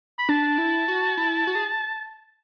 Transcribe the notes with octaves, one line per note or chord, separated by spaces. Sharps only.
B5
D4 A5
E4
F#4
E4
F#4
G#4